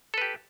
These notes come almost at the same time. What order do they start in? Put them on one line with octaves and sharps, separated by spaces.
A4 B4 G4